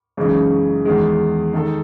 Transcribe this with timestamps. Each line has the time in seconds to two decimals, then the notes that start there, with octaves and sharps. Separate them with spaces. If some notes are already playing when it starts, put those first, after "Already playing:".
0.17 F#2 C#3 E3 G#3 D#4
0.85 E2 D#3 G#3
1.53 D#3 G#3 D#4 A4